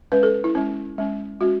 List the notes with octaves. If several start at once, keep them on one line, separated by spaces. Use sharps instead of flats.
G#3 C#4 B4
A4
E4
G#3 C#4
G#3 C#4
G#3 C#4 F#4